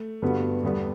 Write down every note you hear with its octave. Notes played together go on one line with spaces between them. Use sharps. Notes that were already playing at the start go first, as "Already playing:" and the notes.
Already playing: A3
G2 D3 G3 B3 F#4
E2 D3 G3 B3